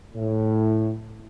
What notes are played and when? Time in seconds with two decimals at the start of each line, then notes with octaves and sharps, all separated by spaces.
0.15 A2